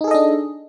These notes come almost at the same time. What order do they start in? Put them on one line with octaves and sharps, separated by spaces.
D#4 G#4 A4 D#5 D4